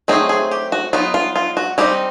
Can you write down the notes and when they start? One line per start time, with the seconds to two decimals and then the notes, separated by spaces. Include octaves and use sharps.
0.08 F#3 A3 C4 D#4 G#4
0.29 G#4
0.51 G4
0.72 F#4
0.93 F#3 B3 D#4 F4
1.14 F4
1.36 F4
1.57 F#4
1.78 G3 C4 D#4 G4